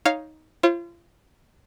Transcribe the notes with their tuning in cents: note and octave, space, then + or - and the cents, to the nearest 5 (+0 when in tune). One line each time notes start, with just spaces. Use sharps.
D#4 +10 C#5 +0 F5 +0
F4 -35 C5 +40